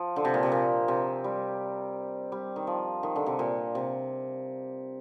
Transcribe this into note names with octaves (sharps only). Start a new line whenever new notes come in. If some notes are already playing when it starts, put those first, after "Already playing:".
Already playing: F3
D3
C3
A#2
C3
A#2
C3
G3
G3
D#3
F3
D#3
D3
C3
A#2
C3